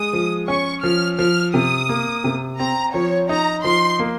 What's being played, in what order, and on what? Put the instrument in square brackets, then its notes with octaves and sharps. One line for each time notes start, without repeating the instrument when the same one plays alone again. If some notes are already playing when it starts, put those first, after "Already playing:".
Already playing: [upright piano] G#3 [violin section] D#6
[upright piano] F3
[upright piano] C#4 [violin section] C#6
[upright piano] F3 [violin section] F6
[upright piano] F3 [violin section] F6
[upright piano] C3 [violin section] D#6
[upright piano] A#3
C3
[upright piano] C4 [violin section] A#5
[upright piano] F3 [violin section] C#5
[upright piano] D#4 [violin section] A#5
[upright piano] F3 [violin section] C6
[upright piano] A#3